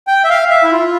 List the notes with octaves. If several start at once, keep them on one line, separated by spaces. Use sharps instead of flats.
G5
E5
F5
E5
E4
F4